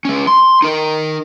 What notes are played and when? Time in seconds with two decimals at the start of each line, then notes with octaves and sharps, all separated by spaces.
0.05 G#3 C#4
0.27 C6
0.62 D#4 A#4